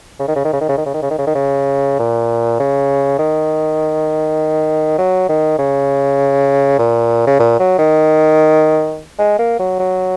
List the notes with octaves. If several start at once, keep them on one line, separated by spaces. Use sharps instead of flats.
C#3
D#3
C#3
D#3
C#3
D#3
C#3
D#3
C#3
D#3
C#3
D#3
C#3
D#3
C#3
A#2
C#3
D#3
F#3
D#3
C#3
A#2
C#3
A#2
F#3
D#3
G#3
A#3
F#3
F#3